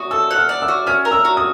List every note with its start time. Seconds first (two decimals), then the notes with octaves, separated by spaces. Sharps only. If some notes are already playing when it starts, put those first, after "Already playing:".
Already playing: F#4 D#6
0.11 A4 E6
0.31 F#5
0.36 F6
0.49 D5
0.62 E6
0.68 F#4
0.87 C#4 F6
1.05 A#4
1.12 E6
1.25 F#4
1.37 D#6